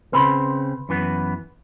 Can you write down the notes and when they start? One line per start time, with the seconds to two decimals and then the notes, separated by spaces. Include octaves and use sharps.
0.13 C#3 C4 B4 B5 C6
0.89 F#2 E3 B3